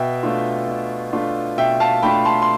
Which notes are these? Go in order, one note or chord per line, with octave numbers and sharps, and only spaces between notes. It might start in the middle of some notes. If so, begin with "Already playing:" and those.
Already playing: B2 E5 G5
A3 D4 F4
B2
A3 D4 F4
B2 E5 G5
F5 A5
A3 D4 F4 G5 B5
A5 C6
C6